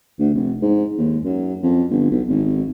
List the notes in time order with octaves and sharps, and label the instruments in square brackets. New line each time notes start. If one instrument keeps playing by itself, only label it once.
[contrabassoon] D2
F1
G#2
D#2
F#2
F2
G1
B1
G#1